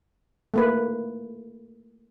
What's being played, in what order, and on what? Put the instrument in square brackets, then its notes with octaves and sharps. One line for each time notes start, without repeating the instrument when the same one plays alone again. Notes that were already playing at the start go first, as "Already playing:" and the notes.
[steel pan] A3 A#3 B4